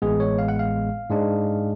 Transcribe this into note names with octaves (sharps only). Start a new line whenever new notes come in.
A1 A2 G#3 B3 G#4
C#5
F5
F#5
F5
G#2 G#3 D4